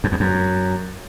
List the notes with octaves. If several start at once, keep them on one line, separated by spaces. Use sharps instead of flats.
F#2
E2
F#2